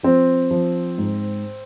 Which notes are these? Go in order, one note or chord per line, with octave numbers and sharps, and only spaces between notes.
F3 C4
F3
G#2